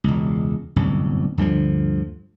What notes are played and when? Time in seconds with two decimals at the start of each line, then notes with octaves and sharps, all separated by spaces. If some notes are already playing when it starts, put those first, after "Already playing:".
0.04 E1 C#2
0.76 D1 G1 C2 F#2
1.38 D2 G2 D3 F3